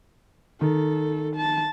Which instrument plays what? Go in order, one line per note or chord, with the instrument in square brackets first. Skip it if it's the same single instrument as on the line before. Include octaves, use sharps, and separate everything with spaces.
[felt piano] D#3 [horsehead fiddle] A4
[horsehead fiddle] A5